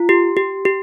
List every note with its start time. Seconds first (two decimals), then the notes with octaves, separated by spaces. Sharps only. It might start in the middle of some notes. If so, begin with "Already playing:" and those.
Already playing: F4
0.09 G4
0.37 G4
0.65 G4